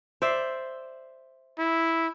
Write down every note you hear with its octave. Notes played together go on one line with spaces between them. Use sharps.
C5 D5 E5
E4